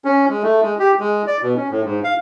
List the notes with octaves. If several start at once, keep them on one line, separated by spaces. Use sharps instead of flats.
C#4
G#3
A3
G#3
G4
G#3
D5
B2
C#4
A2
G#2
F5